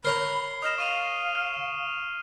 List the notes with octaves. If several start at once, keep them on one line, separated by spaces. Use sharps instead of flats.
A#4 C#5 A#5 B5 C7 G7
D#5 D#6 F6 E7
F5 C#6 D#7 F7
F6 F7